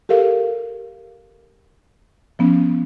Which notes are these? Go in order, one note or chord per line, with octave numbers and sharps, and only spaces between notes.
G4 A4 A#4 F5
F3 B3 C#4